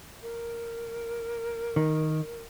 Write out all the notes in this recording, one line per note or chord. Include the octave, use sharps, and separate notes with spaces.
A#4
D#3